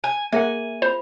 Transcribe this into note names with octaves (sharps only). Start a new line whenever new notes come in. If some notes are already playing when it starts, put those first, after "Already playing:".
G#5
A#3 G#4 A#4 E5 F#5 G#5
F4 C5 B5